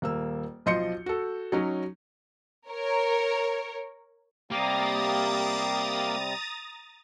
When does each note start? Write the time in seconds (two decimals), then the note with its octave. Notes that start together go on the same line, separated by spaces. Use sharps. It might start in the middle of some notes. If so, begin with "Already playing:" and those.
0.02 D#1 A#3 E6
0.66 B1 F3 D#5 C6 G6 C#7
1.06 F#4 A4
1.52 F#3 C#4 D#4
2.69 A#4 C#5
4.51 C3 G3 A#3 C4 G4 A#5 D#6 A6